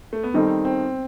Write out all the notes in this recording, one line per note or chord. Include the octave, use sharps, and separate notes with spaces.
A3
B3
D#3 G3 C4 D#4 A4
C4